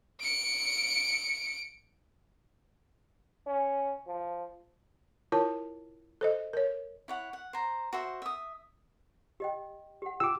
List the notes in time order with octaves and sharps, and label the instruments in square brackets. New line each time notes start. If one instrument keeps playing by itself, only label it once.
[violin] C#7 D7
[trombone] C#4
F3
[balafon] E4 F4 A#4 C#5 A5
A4 C5 D#5
A#4 C#5
[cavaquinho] E4 C#5 F#5
F#5
C5 A#5
F#4 C5 E5
E5 D#6
[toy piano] G4 D#5 G5
G4 F#5
[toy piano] F4 G4 G5 [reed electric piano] D6 E6